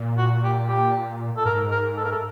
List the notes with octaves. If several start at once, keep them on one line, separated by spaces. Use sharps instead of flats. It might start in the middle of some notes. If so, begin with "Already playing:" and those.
Already playing: A#2
F#4
G4
G4
A4
G#2 A#4
A#4
A4
A#4
A4